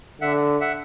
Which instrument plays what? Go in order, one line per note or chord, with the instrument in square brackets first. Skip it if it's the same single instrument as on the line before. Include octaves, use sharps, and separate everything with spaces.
[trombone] D3 [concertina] E5 F#5
[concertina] E5 F#5